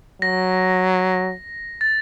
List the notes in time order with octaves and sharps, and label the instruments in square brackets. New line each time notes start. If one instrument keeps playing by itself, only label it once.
[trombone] F#3 [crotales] A#6
[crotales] A6